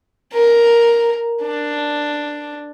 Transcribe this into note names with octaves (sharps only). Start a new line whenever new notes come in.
A#4
D4